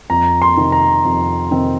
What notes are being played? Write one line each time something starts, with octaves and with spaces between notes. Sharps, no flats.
F2 A#5
C6
C3 D#3 C4 D#4
A#5
F2
C3 D#3 C4 D#4